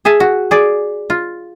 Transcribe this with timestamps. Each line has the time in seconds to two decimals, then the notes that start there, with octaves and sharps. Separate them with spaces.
0.05 G#4 E5 G#5 A5
0.20 F#4
0.51 G#4 D5
1.10 F4